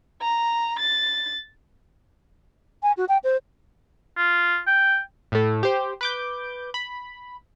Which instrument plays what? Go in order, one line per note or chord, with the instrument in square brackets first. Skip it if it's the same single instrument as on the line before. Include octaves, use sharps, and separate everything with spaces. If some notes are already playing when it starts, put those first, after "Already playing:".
[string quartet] A#5
A6
[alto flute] G#5
F#4
G5
C5
[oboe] F4
G5
[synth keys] A2 A3
G4 C5
B4 D6 G6
B5